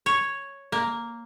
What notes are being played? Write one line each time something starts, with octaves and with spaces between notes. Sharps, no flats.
C#5
A#3